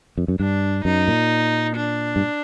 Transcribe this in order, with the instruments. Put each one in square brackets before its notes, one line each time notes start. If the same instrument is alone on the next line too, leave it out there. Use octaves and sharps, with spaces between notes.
[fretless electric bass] F2
F#2
[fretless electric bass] G2 [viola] D4
[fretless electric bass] F#2 [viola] D#4
[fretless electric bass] A#2
[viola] D4
[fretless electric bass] G2